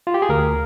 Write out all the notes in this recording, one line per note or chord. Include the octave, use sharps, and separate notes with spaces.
F4
G4
G#4
D2 A#4